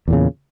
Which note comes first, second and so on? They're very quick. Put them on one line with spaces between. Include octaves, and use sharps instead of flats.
E2 A#2 C#3